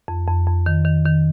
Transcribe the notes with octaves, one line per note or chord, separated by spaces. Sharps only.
F2
F2
F2
D#3
D#3
D#3